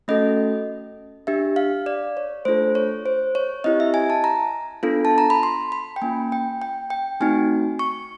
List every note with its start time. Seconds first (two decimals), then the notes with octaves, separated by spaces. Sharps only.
0.08 A3 C#4 F#4 A4 D#5
1.27 D4 G4 E5
1.56 F5
1.86 D5
2.17 C#5
2.45 A3 D4 F4 A4 C5
2.75 C#5
3.06 C5
3.35 C#5
3.64 C4 E4 G4 D#5
3.80 E5
3.94 G#5
4.10 A5
4.24 A#5
4.83 B3 D4 F4 A4
5.05 A5
5.18 A#5
5.30 B5
5.43 C6
5.72 B5
5.96 G5
6.02 A#3 C#4 F4 G#5
6.32 G5
6.62 G5
6.90 G5
7.20 A3 C4 D#4 F#4 G#5
7.79 C#6